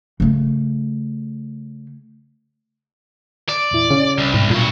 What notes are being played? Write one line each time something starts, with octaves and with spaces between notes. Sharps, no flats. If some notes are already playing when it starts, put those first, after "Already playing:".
C#3 A3
D5
E2 A#2 E4
C#3 C#4
C2
G#2 B2
G2 A#2 F#4